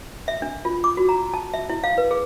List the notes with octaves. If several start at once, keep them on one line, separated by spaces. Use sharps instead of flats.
E5
D4
F4
D6
F#4
A#5
A5
E5
E4
F5
B4
G#4